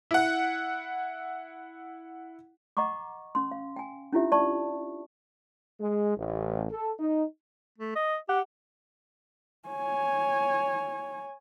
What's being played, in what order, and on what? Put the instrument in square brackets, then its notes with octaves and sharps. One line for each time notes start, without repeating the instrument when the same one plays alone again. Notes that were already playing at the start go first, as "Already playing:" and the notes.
[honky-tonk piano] E4 F#5
[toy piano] D#5 F#5 A#5 C#6 D6
C#4 C6
F5
G5 G#5
C#4 D4 E4 F4 G4 E5
D5 A5 C#6
[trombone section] G#3
A1
A4
D#4
[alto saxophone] A3
D#5
[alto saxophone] G4 [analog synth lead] F#5
[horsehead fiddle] C#5 G#5